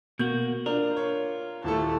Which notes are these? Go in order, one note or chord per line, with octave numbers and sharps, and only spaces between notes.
B2 A#3 F#4 G6
D4 F4 A#4
C#5
D#1 A3 E4 A4 A5